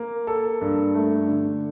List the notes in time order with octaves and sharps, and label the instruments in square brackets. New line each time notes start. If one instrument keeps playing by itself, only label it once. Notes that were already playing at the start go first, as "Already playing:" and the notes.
Already playing: [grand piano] A#3
A4
G2
A3
D3